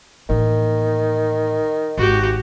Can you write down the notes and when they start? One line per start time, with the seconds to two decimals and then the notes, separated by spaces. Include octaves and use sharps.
0.29 A1 D#3 A#3
1.98 G#1 F#4 G4